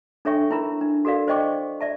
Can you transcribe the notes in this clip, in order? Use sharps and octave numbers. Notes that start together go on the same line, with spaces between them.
D4 A4 C#5 E5 G5 C#6
D#4 E4 A#4 B5
D4
F#4 A4 A#4 D5 F5
C5 D5 D#5 G5 C#6 D6
D5 E5 A5